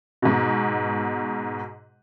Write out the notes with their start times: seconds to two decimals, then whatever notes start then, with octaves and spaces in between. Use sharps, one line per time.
0.22 G#2 B2